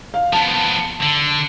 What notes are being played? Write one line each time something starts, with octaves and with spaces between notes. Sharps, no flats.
F5
F3 B3 A5
D3